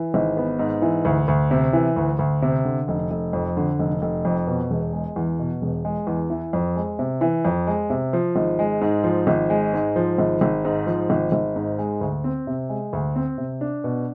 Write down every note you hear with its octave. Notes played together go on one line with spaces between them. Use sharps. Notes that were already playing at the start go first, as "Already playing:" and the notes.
Already playing: E3
G#1
B3
G#2
E3
D2
D2
C3
E3
D2
D2
C3
D3
F1
F1
F2
D3
F1
F1
F2
B2
E1
G#3
E2
B2
E1
G#3
E2
E3
F2
G#3
C3
E3
F2
G#3
C3
F3
G#1
G#3
G#2
F3
G#1
G#3
G#2
F3
G#1
G#1
G#2
F3
G#1
G#1
G#2
G#3
D2
C4
C3
G#3
D2
C4
C3
D4
B2